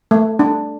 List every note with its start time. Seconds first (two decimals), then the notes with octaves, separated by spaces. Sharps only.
0.11 A3
0.39 D4